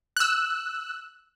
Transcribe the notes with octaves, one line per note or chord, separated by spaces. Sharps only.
E6 F#6